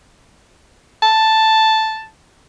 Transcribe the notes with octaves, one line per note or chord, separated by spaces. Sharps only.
A5